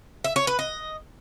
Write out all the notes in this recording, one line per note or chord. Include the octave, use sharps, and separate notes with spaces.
E5
C#5
B4
D#5